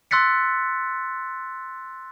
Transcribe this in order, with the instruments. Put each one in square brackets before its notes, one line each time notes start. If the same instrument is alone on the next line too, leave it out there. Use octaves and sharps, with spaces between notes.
[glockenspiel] C6 E6 F#6 A6 B6 C#7